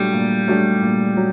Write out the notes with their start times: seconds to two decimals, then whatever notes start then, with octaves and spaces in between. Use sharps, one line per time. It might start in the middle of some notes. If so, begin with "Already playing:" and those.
Already playing: A#2 F#3 G3 A3 D4 G4
0.13 A#2
0.47 F#3 A3 D4 G4
0.82 A#2
1.17 F#3